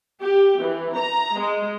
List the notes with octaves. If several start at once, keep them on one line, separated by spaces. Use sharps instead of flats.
G4
E3
A#5
G#3